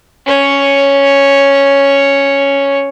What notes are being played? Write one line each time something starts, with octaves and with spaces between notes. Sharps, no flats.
C#4 C#5